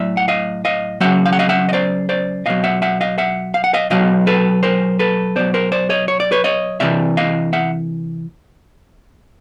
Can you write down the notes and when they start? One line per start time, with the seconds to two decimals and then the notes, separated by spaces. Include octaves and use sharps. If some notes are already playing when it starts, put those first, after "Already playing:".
Already playing: A2 F#3 D5 E5
0.17 F#5
0.28 D#5 F5
0.65 D#5 F5
1.00 C#3 F#3 E5 F#5
1.26 F5
1.33 F#5
1.39 D#5 F5
1.49 E5 F#5
1.69 D#5
1.73 C5 D5
2.09 C5 D5
2.46 B2 F#3 D#5 F5
2.64 E5 F#5
2.82 E5 F#5
3.01 D#5 F5
3.18 E5 F#5
3.54 F5
3.64 F#5
3.74 D#5 F5
3.90 B2 F#3 D#5 F5
4.27 A4 B4
4.63 A#4 C5
4.99 A4 B4
5.36 B2 F#3 C5 D5
5.54 A#4 C5
5.72 C5 D5
5.90 C#5 D#5
6.08 C#5
6.20 D5
6.32 B4 C#5
6.44 C#5 D#5
6.80 C3 E3 D5 E5
7.17 D#5 F5
7.53 E5 F#5